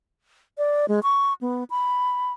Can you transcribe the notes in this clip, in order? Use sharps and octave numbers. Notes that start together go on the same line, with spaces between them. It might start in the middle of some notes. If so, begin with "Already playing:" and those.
D5
G#3
C#6
B3
B5